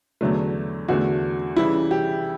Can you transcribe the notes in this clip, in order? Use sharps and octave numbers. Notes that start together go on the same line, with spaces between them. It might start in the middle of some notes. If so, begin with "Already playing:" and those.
E2 D3 F#3 A3
E2 D3 A3 F#4
C#3 E3 G3 E4
G4